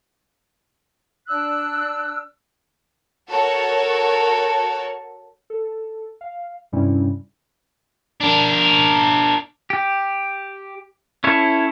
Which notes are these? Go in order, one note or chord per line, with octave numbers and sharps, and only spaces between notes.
D4 E6 F#6
F#4 A4 A#4 C#5 A5
A4
F5
G2 C3 G3 C#4 E4
D4 A#4
G4
C#4 E4 A4 C#5